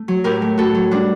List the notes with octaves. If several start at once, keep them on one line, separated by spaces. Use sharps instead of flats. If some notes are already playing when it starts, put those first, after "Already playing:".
Already playing: A3
F#3
A2 G4 A#4
A3
A2 F#4 A4
F#3
G3 D4 F#4